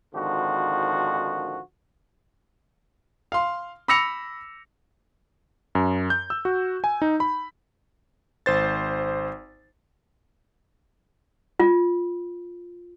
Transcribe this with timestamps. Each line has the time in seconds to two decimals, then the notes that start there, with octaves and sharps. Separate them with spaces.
0.14 G#1 D3 D#3 F3 F#4
3.32 F5 C6
3.88 B5 D6 E6 A#6 C#7 F7
5.75 F#2
6.10 G6
6.30 E6
6.45 F#4
6.84 G#5
7.02 D#4
7.20 B5
8.46 G#1 C5 A6
11.60 F4